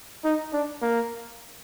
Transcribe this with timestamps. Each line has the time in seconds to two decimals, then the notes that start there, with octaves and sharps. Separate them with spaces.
0.24 D#4
0.53 D4
0.82 A#3